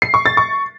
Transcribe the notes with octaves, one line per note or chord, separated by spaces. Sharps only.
C7
C#6
A6
C#6